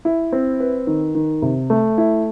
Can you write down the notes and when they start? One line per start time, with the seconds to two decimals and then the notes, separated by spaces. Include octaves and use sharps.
0.05 E4
0.32 C4
0.60 B4
0.87 D#3
1.15 D#3
1.42 C3
1.70 A3
1.98 E4